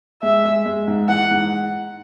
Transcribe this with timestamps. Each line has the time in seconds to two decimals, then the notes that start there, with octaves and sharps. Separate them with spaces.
0.22 G#3 E5
0.45 G#3
0.66 G#3
0.88 G#2
1.08 E3 F#5
1.31 G#2